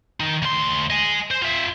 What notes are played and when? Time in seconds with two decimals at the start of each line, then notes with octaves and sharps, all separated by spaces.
0.20 D#3 D#4
0.42 D2 C6
0.90 D#5 G#5
1.31 C5
1.42 F4 E5